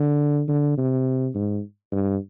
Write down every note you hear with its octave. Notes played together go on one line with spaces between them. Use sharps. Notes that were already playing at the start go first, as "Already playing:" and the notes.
Already playing: D3
D3
C3
G#2
G2